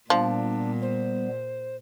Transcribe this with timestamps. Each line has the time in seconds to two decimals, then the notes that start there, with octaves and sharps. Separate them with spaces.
0.10 A#2 F3 G3 B3 D4
0.82 C5